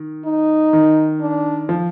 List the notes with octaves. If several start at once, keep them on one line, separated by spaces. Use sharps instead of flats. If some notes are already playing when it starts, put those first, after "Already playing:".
Already playing: D#3
D#4
D#3
D4
F3